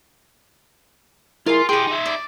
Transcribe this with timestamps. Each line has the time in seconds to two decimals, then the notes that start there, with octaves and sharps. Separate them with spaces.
1.46 E4 F4 G#4 A#4 C6
1.69 E4 G4 G#4 G5 C6
1.87 D#4 E5
2.06 D5